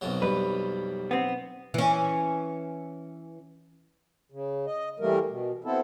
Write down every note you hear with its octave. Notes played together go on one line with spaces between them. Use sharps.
B1 F2 F#3
G3 B4
B3 C4
E3 C#4
C#3
D#5
E3 G3 A3 A#3 A#4
B2
B3 C4 E4 A4